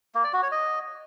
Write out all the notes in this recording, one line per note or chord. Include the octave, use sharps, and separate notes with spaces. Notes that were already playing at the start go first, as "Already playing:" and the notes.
A#3
D5
F#4
C#5
D#5